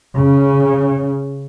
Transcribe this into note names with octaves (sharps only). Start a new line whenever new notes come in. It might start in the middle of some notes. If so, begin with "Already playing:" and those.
C#3